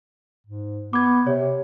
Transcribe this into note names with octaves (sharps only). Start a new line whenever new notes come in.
G#2
B3 D6 G#6
C3 C#5